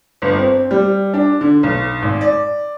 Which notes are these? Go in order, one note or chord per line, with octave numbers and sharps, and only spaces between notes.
G1
C4
G3
D4
D3
B1
G#1
D5